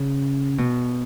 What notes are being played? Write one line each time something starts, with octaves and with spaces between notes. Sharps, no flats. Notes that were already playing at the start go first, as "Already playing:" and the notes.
Already playing: C#3
B2